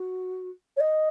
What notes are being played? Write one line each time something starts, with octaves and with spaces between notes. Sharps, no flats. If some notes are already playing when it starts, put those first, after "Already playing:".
Already playing: F#4
C#5
D#5